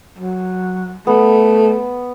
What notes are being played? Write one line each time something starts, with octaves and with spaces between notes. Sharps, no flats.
F#3
A3 B3